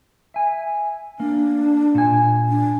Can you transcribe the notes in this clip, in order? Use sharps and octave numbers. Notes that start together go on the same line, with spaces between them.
E5 G#5
A#3 D4
A#2 G#5
D4